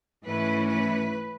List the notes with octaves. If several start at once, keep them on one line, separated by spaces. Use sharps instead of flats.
G#2 E3 A3 C#4 E4 B4
B4